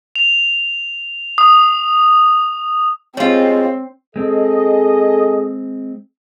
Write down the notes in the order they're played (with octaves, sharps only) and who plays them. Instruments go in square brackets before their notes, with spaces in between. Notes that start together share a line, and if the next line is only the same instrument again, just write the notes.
[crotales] F7
D#6
[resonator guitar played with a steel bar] G3 F4 [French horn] G#3 [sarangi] C4 [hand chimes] C#5
[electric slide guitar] G#3 C4 [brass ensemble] G#4 A4 D#5